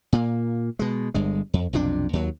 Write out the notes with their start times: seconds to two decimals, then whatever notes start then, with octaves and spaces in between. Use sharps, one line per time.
0.13 A#2 A#3
0.79 B2 G#3
1.14 G1 G2 G#3
1.54 F2
1.73 B1 F2 C3 D4
2.13 D#2 F#3